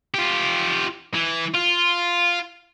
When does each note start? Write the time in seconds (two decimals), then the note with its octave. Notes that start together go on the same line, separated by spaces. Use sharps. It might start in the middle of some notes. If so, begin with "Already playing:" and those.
0.14 F4 G4
1.15 E3
1.55 F4